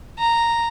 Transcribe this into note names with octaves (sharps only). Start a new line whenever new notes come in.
A#5